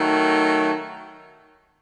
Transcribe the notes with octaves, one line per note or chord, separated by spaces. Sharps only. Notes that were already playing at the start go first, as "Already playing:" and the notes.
Already playing: D#3 F#3 A3